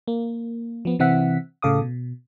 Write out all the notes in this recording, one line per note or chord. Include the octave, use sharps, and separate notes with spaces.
A#3
F3 B3
C3 E3 C4 E5 F#5 B6
A2 C#3 A4 F5 D6 D#6
B2